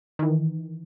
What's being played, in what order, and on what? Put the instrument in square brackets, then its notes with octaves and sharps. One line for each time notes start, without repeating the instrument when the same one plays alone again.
[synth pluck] D#3 E3